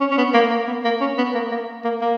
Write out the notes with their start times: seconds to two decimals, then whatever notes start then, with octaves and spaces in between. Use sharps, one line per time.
0.01 C#4
0.11 C#4
0.18 B3
0.34 A#3
0.50 A#3
0.68 B3
0.84 A#3
1.01 C#4
1.18 B3
1.34 A#3
1.51 A#3
1.84 A#3
2.01 A#3